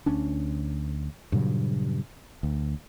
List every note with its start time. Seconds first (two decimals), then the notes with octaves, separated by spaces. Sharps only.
0.06 D2 C#4 D4
1.32 G2 A#2 C#3 F#3
2.43 D2